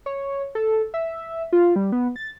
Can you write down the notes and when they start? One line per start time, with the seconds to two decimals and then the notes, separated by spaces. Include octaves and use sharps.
0.06 C#5
0.55 A4
0.94 E5
1.53 F4
1.76 G3
1.92 B3
2.16 A6